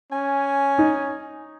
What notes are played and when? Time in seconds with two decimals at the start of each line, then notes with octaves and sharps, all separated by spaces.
0.12 C#4 G#5
0.79 D#4